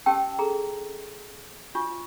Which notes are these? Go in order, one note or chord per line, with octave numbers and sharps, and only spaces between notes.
C#4 G4 G5 A5 E6
G#4 A4 A#5
D4 F4 F#4 C#6